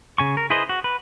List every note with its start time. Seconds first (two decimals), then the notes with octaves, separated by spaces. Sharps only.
0.18 C#3 G#5 C#6
0.37 A#4
0.50 E4 G#4 B4 C5 D#5
0.69 F#4
0.84 B4